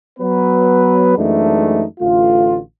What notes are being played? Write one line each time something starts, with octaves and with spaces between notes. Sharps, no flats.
F#3 B3 B4
F#2 E3 G#3 A3 D4 D#4
A1 D3 A3 F4